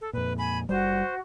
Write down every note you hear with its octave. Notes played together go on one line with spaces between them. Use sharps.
A4
F2 A#2 B4
G#5 B5
F#1 G3 F#4 C5